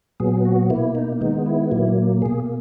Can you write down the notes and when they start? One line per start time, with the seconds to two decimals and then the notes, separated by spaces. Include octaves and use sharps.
0.20 A#2 F#3 B3 G#4
0.45 F#4
0.70 B2 A#3 E4
0.95 D#4
1.21 D#3 G#3 B3 D#4
1.46 E4
1.71 A#2 F#3 A#3 E4
2.22 B2 A#3 G#4